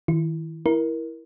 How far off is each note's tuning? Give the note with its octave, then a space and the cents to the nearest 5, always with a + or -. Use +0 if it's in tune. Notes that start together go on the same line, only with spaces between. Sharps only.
D#3 +35 E4 +20
E4 +0 A#4 +15